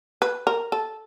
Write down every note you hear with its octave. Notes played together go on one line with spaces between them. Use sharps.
B4
A#4
A4